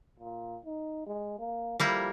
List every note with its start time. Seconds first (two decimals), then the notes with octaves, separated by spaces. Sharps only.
0.19 A#2
0.65 D#4
1.06 G#3
1.39 A#3
1.80 F3 G3 A#3 E4